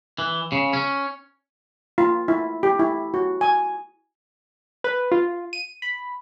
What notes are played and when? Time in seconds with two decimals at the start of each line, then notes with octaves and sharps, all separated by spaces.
0.18 E3
0.52 C#3
0.73 C#4
1.98 F4
2.28 E4
2.63 G4
2.79 E4
3.14 F#4
3.41 G#5
4.84 B4
5.12 F4
5.53 D#7
5.82 B5